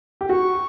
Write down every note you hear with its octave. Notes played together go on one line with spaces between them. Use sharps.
G4
F#4 C#6